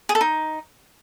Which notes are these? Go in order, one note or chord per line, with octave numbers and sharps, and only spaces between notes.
G#4
A4
D#4